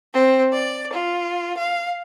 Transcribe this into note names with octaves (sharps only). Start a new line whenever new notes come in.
C4
D5
F4
F5